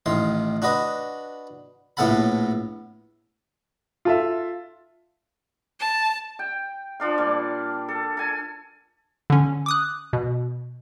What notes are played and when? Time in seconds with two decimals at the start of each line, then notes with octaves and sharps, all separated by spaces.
0.06 A1 D#3 C6
0.62 D4 F#4 B4 D#5 B5
1.97 A#1 A2 B3 A4 F#5 B5
4.05 F4 A4 E5
5.79 A5
6.39 G5
7.00 F3 D4 F5
7.18 A#2 G3
7.89 A4
8.17 A4 G#5
9.30 D3 C#4
9.66 D6 D#6 F#6
10.13 B2